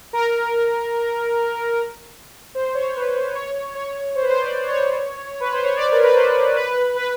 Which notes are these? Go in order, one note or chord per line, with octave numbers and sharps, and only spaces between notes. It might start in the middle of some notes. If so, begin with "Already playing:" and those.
A#4
C5
C#5
B4
C5
C#5
C#5
C5
B4
C5
D5
C#5
B4
C5
C#5
D5
A#4
B4
C5
B4
B4